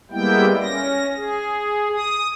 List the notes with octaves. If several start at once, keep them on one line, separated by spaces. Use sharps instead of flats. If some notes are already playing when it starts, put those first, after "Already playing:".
G3 G#3 A#3 B3 E4 G5
C#4 A#6
G#4
D#6